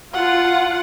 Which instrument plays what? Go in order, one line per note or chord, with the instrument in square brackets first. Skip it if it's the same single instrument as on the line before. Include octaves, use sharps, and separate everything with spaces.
[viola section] F4 [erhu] F#5